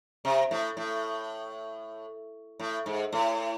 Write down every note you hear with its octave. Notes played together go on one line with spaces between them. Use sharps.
C3
A2
A2
A2
G#2
A2